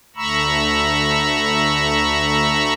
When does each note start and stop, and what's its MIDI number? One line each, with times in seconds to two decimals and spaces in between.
0.16 2.73 38
0.16 2.73 57
0.16 2.73 82
0.16 2.73 83
0.16 2.73 85
0.16 2.73 88